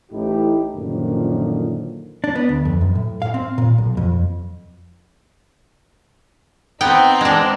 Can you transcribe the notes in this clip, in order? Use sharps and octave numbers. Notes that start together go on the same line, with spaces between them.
A1 A2 D#4 E4 G4
F#2 A#2 D3 D#3 F3
D4
B3
D2
F2
F#2
A2
F5
C4
A#2
B1
F2
B3 C4 D#4 G5
G#3 D4